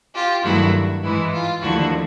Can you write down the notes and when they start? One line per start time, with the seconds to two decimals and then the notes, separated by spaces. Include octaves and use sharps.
0.14 F4 G4
0.43 G2 D#3 F#3 A3 E4 F#4
1.02 G#2 E3 G#3 E4
1.32 F4
1.61 D#2 D3 F3 A3 E4 F#4